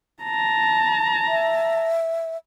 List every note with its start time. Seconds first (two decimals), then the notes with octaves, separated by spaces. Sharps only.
0.23 A5 A#5
1.28 E5